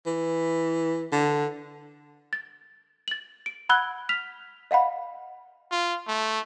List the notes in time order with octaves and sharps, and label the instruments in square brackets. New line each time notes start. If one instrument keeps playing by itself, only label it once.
[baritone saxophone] E3
D3
[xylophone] A6
A6 F#7
D7
F#5 B5 E6 F#6 G#6 G7
F6 B6 F7
D#5 F5 F#5 B5
[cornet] F4
A3